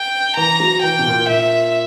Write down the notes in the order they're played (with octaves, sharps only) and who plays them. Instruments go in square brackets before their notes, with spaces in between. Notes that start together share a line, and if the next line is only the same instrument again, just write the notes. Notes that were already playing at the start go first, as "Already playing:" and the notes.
Already playing: [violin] G5
[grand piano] E3 [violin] A#5
[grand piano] F#3
[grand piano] E3 [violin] G5
[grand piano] B2
A#2
[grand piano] A#2 [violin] E5